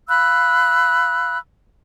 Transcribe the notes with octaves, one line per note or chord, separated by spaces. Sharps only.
F5 B5 E6 F#6